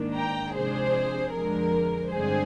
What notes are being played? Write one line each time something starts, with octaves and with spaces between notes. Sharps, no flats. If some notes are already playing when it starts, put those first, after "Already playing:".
Already playing: G#2 D#3 A#3 D4
G5 A#5
C3 F3 G#3 D4 G#4 C5
F2 D3 F3 G#3 A#4
G2 D3 G#3 C4 G#4 C5